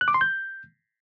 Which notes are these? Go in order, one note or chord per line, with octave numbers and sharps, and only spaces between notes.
F#6
D6
C6
G6